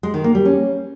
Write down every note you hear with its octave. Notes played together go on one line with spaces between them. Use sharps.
G#3
D#3
A#3
G3
C#4